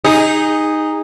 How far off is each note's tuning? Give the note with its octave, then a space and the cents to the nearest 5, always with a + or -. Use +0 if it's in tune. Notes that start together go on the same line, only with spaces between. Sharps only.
D#4 +0 G#4 -25